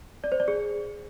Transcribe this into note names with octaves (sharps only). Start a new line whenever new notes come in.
D5
C5
D5
G#4